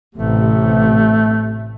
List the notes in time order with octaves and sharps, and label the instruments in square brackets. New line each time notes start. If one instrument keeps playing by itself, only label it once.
[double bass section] A1 C3 [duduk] A3